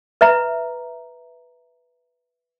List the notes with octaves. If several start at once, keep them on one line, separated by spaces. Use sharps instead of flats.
B4 E5 A#5